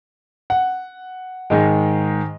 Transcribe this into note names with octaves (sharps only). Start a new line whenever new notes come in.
F#5
G#2 D#3 G#3 D#5